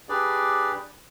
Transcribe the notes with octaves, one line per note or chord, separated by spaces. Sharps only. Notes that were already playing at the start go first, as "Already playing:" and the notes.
D4 G4 G#4 B4 D5